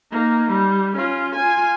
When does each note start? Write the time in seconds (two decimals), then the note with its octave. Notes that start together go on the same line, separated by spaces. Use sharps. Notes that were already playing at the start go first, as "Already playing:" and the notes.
0.12 A#3 D#4
0.51 G3
0.97 C#4 F4
1.36 F4 G#5